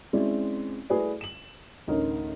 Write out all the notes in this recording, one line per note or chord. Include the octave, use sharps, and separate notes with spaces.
G#3 C4 C#4 E4 D5
A3 E4 G#4 B4 D5
E7 F#7
A1 D2 D#4 A#4 C#5 D#5